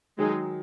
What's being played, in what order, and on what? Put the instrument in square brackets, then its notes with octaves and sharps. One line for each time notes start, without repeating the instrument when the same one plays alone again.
[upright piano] D#3 F#3 [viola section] G#3 D#4 G#4